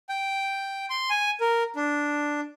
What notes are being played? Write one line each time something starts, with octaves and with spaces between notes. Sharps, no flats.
G5
C6
G#5
A#4
D4